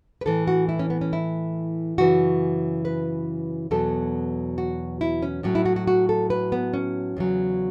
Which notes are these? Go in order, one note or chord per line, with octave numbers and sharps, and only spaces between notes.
B4
A2 E3 A4
F#4
E4
C#4
B3
C#4
E4
F#2 C#3 E3 F#4
B4
E2 B2 F#3 A4
F#4
E4
C#4
A2 F#3 C#4
E4
F#4
F#4
F#4
A4
B4
B3
C#4
E2 C#3 F#3